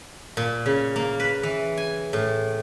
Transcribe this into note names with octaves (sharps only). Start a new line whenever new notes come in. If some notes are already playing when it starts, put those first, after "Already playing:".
A#2
C#3
A#3
B4
E3
G#5
A2